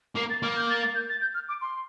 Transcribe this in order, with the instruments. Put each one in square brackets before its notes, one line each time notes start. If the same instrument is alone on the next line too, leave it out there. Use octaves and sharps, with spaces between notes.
[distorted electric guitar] A#3 [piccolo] C7
[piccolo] A6
[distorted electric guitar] A#3 [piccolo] F6
[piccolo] G6
A6
A6
G6
A6
G6
F6
D6
C6